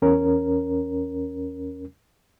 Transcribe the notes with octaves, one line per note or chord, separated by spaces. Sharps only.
E2 C#4 A#4